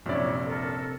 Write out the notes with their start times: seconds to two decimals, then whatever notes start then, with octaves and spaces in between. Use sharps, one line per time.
0.06 A#1 F#2 C3 D4 E4 C#5 D5
0.46 A4 A#4